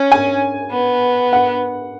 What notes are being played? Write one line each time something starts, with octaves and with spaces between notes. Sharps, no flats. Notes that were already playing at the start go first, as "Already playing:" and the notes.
Already playing: C#4
G#5
B3
F#5